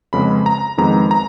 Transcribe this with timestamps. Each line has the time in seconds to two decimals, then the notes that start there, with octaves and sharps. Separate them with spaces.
0.13 F2 C#3 G#3 B3 B5
0.46 A#5
0.78 F2 D#3 G#3 B3 A#5
1.11 A#5